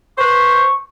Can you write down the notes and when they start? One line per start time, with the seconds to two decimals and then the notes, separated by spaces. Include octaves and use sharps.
0.18 B4 C5 C#6